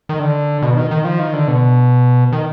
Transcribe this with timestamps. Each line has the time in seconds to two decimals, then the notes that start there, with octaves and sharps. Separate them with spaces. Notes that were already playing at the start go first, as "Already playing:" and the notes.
0.09 D#3
0.19 D3
0.62 B2
0.76 D#3
0.91 D#3
1.05 F3
1.19 D#3
1.33 D3
1.48 B2
2.32 D#3